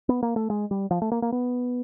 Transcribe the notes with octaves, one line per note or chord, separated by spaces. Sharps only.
B3
A#3
A3
G#3
G3
F3
A3
A#3
A#3
B3